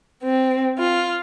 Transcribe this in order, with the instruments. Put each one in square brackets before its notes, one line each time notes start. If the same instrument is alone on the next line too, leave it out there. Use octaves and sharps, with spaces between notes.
[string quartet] C4
F4